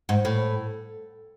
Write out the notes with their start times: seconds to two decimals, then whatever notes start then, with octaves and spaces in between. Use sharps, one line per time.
0.09 G#2
0.25 A2